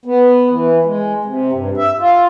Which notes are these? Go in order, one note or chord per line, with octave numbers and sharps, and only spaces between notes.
B3
E3
G#3
C3
G2
E5
F4